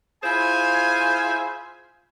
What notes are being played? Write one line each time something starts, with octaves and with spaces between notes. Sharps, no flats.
E4 F4 G#4 C5 G#5